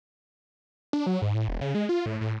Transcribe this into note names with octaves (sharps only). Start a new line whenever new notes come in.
D4
F#3
G#2
A2
E1
C#3
G#3
F4
A2
A2